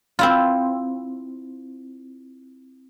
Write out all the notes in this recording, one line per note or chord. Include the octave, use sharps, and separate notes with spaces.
C4 E4 F4